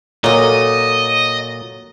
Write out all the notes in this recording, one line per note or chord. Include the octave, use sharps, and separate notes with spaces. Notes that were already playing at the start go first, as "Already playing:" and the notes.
A#2 F#3 A4 C#5 D#5